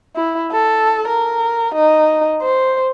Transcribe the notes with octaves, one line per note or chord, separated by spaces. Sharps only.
E4
A4
A#4
D#4
C5